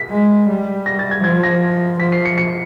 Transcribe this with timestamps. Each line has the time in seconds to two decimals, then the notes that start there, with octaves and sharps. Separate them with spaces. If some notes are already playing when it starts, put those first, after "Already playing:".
Already playing: B6
0.10 G#3
0.49 G3
0.86 A#6
0.99 A6
1.11 G#6
1.24 F3 G#6
1.43 A#6
2.00 F3 B6
2.12 C7
2.25 C#7
2.38 C#7